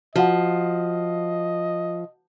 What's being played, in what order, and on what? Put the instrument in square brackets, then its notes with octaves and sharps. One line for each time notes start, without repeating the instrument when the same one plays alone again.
[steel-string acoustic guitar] F3 [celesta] F#4 F5 F#5 [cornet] D#5